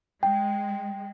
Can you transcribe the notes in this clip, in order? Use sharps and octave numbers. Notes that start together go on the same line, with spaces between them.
G#3 G5